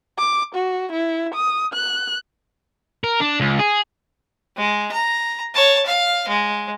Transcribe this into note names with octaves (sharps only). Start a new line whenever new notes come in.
D6
F#4
E4
D#6
F#6
A#4
D4
C#2
G#4
G#3
A#5
C#5 A5
F5
G#3